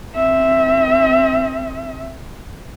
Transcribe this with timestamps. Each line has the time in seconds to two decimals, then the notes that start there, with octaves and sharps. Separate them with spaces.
0.15 C4 E5